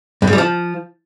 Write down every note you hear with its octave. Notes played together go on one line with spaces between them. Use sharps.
G2
G#2
G3
F3